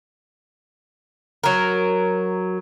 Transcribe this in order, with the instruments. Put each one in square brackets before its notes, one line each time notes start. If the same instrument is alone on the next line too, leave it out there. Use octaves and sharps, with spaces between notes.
[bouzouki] F#3 A#4